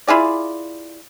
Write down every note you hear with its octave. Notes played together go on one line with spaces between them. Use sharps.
E4 F4 G#4 D5